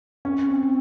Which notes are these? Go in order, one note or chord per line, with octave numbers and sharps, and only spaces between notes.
C#4
C4